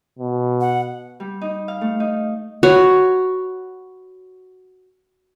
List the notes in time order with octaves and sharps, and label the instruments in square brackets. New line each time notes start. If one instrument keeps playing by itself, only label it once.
[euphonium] B2
[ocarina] F#5
[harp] G3
D#4
F5
A3
D#4
[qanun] F#4 B4 C#5